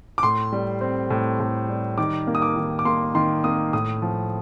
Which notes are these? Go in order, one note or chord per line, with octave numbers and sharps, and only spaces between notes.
D6
A2 C6
G3
C4
A2
A2
G3
D#3 D6
A#3
D#6
D6
D#3
D6
A#3 C6
D#3 C6
A#3 D#6
A2 D#6
F3